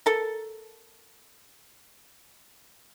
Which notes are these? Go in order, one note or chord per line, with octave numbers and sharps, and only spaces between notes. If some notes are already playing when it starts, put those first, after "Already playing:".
A4 A#4